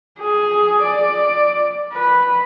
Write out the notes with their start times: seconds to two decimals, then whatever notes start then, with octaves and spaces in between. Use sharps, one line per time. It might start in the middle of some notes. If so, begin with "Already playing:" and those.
0.20 G#4
0.82 D5
1.93 B4